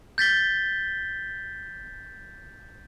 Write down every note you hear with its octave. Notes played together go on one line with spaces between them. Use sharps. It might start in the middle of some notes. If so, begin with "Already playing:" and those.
G6 A6 B6 G7